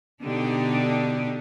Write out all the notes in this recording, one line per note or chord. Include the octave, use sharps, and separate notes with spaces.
B2 D3 D4 D#4 G4